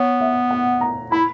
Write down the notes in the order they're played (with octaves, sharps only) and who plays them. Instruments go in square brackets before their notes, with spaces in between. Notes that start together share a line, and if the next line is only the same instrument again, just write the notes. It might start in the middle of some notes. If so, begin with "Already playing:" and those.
Already playing: [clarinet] B3 [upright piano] C#5
[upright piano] E5
F#5
A#5
[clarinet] E4 [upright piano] B5